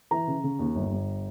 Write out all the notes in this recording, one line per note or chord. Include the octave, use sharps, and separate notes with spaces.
E3 A#5
C#3
C#3
D#2
G1
G1